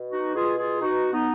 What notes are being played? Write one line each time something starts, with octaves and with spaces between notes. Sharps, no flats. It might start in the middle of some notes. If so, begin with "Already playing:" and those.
Already playing: B2
D#4 F#4
B2 F4 G#4
F4 G#4
B2 D#4 F#4
B3 D#4